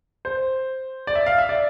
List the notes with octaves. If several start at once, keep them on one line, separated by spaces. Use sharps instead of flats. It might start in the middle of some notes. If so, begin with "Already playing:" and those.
C5
D5
E5
F5
E5
D5